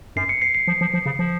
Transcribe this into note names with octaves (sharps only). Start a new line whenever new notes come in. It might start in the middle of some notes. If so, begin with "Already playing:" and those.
F#2 C7
C#7
C7
C7
F3
F3
F3
C#3
F3